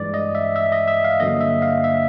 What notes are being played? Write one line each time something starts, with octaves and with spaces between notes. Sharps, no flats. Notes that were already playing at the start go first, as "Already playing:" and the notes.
Already playing: G2 E3 G#3 D5
D#5
E5
E5
D#5
E5
F5
G2 D3 F#3 A#3 D#5
E5
F5
E5